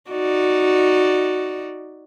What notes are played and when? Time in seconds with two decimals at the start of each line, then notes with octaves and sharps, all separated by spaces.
0.11 D#4 F#4 D5